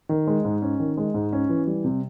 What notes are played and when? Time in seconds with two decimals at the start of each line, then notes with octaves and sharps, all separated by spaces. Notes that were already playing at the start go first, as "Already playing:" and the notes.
0.09 D#3
0.27 G#3
0.45 G#2
0.62 C#4
0.80 D#3
0.97 G#3
1.14 G#2
1.33 C#4
1.49 E3
1.67 G3
1.84 C3